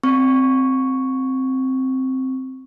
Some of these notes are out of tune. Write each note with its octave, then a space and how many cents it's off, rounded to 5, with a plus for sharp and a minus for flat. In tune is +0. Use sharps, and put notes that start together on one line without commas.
C4 +0 C#6 +0